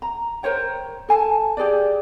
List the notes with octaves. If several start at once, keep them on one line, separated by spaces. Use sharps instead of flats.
A#5
A#4 C5 C#5 G5
A4 G#5 A5
G4 G#4 B4 D5